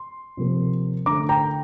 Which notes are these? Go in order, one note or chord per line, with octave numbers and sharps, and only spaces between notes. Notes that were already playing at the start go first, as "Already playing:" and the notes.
Already playing: C6
C3 F3 A#3
D3 A3 A#5 D6
G5 A#5